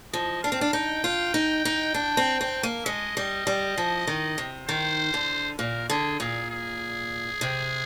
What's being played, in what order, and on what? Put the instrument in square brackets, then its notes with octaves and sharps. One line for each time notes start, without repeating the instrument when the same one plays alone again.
[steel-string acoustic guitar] F3 [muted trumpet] D#5
[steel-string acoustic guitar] D4 [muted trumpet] F5
[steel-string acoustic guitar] C4
D4
[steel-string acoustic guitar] D#4 [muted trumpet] G5
[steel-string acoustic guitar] F4
D#4
D#4
D4
C4
C4
A#3
[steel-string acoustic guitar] G#3 [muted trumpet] D#5
[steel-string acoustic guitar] G3
G3
F3
D#3
C3
[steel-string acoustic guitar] D#3 [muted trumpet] C5
[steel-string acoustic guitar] D3
[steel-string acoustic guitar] A#2 [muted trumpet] A#4
[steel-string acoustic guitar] D3 [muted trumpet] G#4
[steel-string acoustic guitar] A#2 [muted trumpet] G#4
[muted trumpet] G#4
[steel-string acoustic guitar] C3